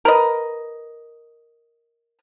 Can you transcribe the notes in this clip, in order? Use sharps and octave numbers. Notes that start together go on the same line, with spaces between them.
A#4 B4 D#5